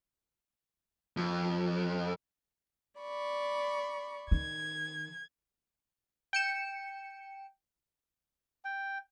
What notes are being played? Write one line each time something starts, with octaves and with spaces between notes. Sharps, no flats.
F2
D5 B5 C#6
D#3 G#6
G5 C#7 E7
G5